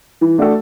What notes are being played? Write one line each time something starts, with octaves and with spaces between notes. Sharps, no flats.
E3
A3 D4 F#4 A4